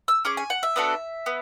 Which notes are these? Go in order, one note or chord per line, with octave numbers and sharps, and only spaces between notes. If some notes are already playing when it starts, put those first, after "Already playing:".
E6
C#4 G#4 D6
G#5
F#5
E5
B3 D4 F#4 A4
B3